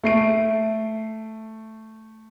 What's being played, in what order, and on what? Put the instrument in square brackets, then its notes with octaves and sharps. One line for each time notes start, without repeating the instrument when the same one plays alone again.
[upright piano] A3 C7 D7